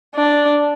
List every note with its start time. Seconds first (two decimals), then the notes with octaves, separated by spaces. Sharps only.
0.15 D4